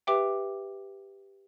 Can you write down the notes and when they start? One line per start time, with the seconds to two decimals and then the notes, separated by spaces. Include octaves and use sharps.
0.07 G4 B4 E5 G5 D6